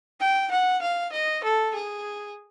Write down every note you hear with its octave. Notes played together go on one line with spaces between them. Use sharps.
G5
F#5
F5
D#5
A4
G#4